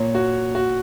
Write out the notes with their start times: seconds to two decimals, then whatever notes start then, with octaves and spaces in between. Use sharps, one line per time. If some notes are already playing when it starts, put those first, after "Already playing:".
Already playing: A#2 C#5
0.15 F#4
0.55 F#4